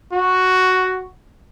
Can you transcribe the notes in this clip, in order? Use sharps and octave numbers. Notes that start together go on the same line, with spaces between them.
F#4